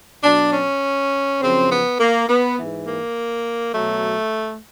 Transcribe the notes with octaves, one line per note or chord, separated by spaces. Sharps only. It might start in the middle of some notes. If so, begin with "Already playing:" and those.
B2 F#3 D4
C#4
F#2 C#3 F3 C4
B3
A#3
B3
G#2 E3
A#3
B2 F#3 A3